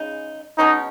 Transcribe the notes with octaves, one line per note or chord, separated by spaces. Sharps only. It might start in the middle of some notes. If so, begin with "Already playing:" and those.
Already playing: C#3 G#3 D#4
B2 G#3 C#4 D#4